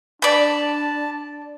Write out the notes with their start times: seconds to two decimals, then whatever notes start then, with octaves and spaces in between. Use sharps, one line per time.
0.22 D4 D5 A5 B5